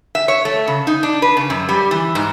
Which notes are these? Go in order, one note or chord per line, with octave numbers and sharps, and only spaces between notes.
E5
C#5
A3
C#3
D#4
D4
B4
C#3
F#2
G3
E3
G#2